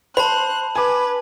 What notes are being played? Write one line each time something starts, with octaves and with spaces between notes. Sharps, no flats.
C5 A5 B5 F#6
B4 G#5 D6